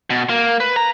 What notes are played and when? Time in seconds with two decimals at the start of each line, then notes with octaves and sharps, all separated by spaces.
0.10 B2
0.29 A#3
0.60 B4
0.76 A#5